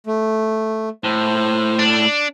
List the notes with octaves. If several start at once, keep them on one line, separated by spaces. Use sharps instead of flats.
A3
A2 C5
D4